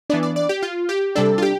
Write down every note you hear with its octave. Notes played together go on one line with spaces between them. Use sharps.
E3 B3 D4 D5
D5
D5
G4
F4
G4
C3 G3 D4 A4
F4
G4